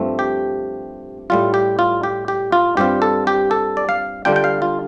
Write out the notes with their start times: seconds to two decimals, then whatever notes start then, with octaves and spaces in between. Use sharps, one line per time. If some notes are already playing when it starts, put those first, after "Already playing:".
Already playing: G2 F3 A3 C4
0.19 G4
1.30 A2 G3 F4
1.54 G4
1.79 F4
2.03 G4
2.28 G4
2.52 F4
2.77 G2 G3 C4 F4 G4
3.02 A4
3.27 G4
3.51 A4
3.77 D5
3.89 F5
4.25 D3 G3 D4 F4 G5
4.36 G5
4.44 F5
4.62 F4